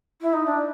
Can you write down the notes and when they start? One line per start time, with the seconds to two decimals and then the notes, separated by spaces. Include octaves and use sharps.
0.21 E4
0.33 D#4
0.45 D4